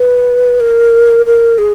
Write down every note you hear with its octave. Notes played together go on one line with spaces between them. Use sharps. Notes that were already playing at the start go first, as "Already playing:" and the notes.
Already playing: B4
A#4
A#4
G#4